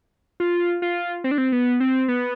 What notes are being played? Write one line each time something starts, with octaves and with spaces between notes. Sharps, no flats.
F4
F4
C4
D4
C4
B3
C4
B3